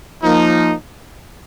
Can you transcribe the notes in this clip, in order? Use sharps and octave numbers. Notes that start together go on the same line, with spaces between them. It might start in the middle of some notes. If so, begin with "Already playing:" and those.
F3 A#3 D#4